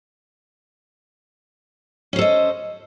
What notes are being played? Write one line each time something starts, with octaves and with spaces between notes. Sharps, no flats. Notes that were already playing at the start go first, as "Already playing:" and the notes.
C#4 A4 C5 D#5